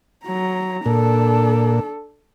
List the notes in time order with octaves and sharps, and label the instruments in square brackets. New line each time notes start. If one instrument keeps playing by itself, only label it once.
[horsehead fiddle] F#3 A#5
[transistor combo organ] A#2 [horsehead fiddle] D4 A4